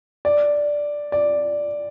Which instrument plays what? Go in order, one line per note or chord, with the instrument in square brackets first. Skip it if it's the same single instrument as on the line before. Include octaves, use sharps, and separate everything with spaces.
[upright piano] D5
D5